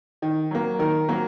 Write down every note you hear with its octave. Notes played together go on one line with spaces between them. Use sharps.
D#3
F#3 A#3
D#3 A#4
F#3 A#3